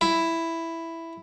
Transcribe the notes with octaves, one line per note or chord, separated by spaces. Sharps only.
E4